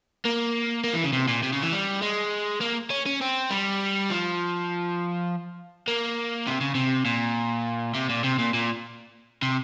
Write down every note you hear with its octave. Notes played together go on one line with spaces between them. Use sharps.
A#3
A#3
E3
C#3
C3
A#2
C3
C#3
E3
G3
G#3
A#3
C#4
C#4
C4
G3
F3
A#3
C3
C#3
C3
A#2
C3
A#2
C3
A#2
A#2
C3